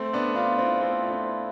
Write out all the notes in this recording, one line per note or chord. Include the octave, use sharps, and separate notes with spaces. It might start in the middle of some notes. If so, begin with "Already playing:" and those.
Already playing: A3 C4
B3 D4
D4 F4
C4 E4
A3 C4
F4
C4 E4